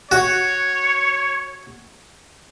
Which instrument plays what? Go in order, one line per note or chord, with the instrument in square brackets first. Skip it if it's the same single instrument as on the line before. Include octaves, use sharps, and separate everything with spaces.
[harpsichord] F#4 [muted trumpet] C#5